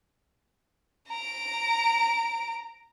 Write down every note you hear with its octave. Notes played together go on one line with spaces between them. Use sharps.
A#5 D7